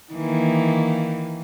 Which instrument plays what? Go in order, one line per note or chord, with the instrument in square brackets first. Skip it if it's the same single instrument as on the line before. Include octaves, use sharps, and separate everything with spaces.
[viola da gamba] D#3 E3 A#3